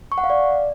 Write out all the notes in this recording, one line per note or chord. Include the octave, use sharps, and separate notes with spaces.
C#6
F#5
F5
D5